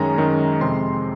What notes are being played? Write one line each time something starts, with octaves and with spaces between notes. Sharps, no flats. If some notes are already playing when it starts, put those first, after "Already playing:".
Already playing: F#2 D#3 G#3 C#4 A#5
F#2 D#3 G#3 C#4
F2 C3 F3 G#3 C4 C6